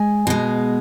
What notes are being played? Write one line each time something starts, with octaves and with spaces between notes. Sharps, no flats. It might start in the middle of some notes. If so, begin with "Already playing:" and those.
Already playing: G#3 G#5
B2 G#3